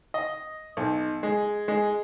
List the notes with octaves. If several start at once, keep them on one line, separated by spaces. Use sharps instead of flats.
D#5
B1
G#3
G#3